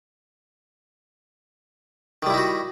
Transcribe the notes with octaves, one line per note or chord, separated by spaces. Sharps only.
D#3 G3 D#4 E4 F#4